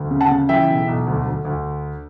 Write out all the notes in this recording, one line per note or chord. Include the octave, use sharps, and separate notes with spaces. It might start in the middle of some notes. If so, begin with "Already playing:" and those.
Already playing: D2
C#3
F#5 A5
C#3
E3 E5 G5
B1
B1
D2
D2
D2